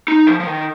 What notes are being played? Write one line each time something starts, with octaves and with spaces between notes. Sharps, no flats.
D#4
F3
F3
D#3